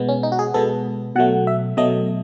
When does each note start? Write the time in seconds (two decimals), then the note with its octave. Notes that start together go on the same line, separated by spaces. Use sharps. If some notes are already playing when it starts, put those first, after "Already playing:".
Already playing: B2 G#3 B3
0.09 C#4
0.23 D#4
0.32 F#4
0.39 G#4
0.54 B2 G#3 B3 A4
1.16 B2 F#3 A3 F#5
1.47 E5
1.77 B2 F#3 A3 D#5